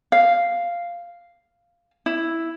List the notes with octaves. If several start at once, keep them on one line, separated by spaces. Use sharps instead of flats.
F5
E4